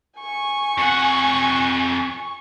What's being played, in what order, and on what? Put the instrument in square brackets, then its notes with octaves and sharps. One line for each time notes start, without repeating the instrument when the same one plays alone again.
[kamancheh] G#5 C#6
[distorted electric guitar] F2 F#5